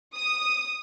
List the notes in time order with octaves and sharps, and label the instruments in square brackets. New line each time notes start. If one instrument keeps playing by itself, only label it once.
[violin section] D#6